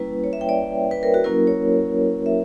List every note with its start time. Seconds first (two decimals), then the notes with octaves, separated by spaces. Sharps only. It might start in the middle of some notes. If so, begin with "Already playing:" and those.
Already playing: G3 A#3 C#4 E4 B4
0.24 C#5
0.33 E5
0.41 G5
0.49 D5
0.91 B4
1.03 A#4
1.14 F#4
1.24 F#3 A#3 C#4 E4 A#4
1.47 C#5
2.26 E5